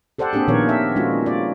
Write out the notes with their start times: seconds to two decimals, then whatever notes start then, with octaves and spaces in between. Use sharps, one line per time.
0.18 G4 A4 C5 D5 F#5
0.33 A#3 C4 D4 G4 G#4
0.48 A#2 D#3 F3 B3 A#4 C#5
0.69 E5
0.96 G#3 C#4 F4 F#4
1.26 D5